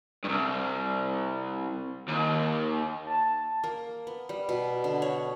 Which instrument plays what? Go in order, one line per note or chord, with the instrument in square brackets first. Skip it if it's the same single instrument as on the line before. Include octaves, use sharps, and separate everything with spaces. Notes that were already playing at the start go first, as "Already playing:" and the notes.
[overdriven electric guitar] C2 G2
D#2
[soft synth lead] A5
[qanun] A#3
B3
G3
B2
D3
C#5